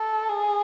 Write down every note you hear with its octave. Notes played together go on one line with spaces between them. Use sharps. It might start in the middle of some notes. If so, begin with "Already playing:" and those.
Already playing: A4
G#4